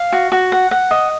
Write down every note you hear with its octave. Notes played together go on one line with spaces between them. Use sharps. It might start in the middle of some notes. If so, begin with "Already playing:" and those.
Already playing: F5
F#4
F#4
F#5
F#5
D#5